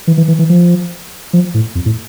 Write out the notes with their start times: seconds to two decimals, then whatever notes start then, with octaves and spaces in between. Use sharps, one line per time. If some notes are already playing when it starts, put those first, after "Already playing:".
0.07 E3
0.17 E3
0.28 E3
0.39 E3
0.49 F3
1.33 F3
1.54 A2
1.75 F2
1.85 A2